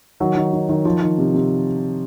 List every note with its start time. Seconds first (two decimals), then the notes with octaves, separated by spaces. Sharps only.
0.20 D#3 F#3
0.37 D#3
0.53 D#3
0.69 D#3
0.85 D#3 F3
1.02 D#3
1.18 C3
1.34 C3